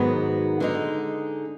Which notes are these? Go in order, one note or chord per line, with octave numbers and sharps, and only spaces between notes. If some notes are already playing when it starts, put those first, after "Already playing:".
Already playing: G#2 D#3 F#3 B3
D3 G#3 D#4